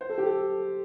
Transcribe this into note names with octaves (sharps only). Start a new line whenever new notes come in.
C5
A4
G4
A4